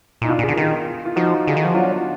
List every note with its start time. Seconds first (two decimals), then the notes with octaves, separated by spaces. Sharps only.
0.21 A#2 D#4
0.28 B2 D4 F4
0.39 A#2
0.43 G#4
0.48 D3
0.53 A#4
0.57 D#3 F4 G#4
1.05 F4
1.16 F3 D#4 F#4
1.47 D3 G#4
1.57 D#3
1.61 F3 F#4
1.74 F#3 D4 F4